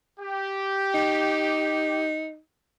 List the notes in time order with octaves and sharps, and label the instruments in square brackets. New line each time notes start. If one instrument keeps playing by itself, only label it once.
[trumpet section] G4
[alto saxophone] D#4